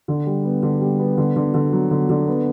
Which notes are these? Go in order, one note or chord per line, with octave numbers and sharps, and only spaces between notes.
D3
G3
B3
D3
G3
B3
D3
D3
D3
F#3
D3
D3
B3